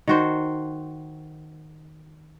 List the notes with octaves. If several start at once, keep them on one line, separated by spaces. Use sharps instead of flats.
D#3 F#4 C5